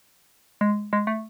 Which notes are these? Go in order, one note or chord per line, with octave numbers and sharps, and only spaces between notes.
G#3
G#3
A3